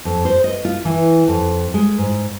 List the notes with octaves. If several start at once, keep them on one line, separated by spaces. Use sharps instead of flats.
F2
C5
D#5
F4
E3
F2
G#3
G#2